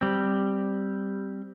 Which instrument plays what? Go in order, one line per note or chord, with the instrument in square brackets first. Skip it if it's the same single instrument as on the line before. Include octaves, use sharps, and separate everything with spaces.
[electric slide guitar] G3 C4